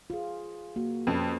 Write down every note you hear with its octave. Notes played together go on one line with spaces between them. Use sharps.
F4 G#4
A#3 F#4
F2 C#4 B4